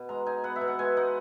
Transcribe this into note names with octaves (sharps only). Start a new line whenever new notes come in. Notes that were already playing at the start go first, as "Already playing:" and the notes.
Already playing: B2
G#3 A#5
D#4 G#5
B3 F#5
E5
B2
F#5
G#3 G#5
D#4 F#5